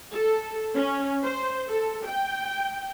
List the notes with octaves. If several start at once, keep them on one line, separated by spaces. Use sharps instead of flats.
A4
C#4
C5
A4
G5